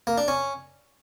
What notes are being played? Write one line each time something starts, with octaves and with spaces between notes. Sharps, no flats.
A#3
D4
C#4